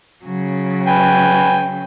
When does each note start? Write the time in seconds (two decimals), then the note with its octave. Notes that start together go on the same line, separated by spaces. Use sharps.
0.23 C#3 F#3
0.87 B4 G5 G#5